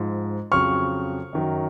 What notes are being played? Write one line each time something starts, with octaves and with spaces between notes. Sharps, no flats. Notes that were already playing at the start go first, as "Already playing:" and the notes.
Already playing: G#2 F3
F2 C#3 F#3 C#6 F6
F#2 D#3 F#3